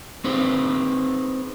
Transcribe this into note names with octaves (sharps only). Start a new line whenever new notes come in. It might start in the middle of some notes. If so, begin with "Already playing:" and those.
C4 D#4 G#4 B4 C5